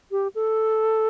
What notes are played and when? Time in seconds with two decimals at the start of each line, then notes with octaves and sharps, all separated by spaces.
0.11 G4
0.35 A4